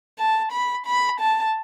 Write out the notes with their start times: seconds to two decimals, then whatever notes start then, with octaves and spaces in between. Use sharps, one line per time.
0.18 A5
0.51 B5
0.86 B5
1.20 A5